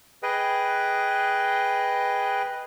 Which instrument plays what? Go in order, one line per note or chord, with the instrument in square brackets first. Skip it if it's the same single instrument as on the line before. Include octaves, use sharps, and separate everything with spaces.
[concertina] G#4 B4 D#5 G5